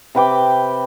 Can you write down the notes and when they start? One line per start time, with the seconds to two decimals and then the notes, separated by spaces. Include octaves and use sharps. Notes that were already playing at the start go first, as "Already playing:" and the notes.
0.15 C3 B4 G5 D6